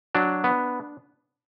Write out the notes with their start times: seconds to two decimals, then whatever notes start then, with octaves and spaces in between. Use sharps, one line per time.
0.15 F#3 D4
0.44 B3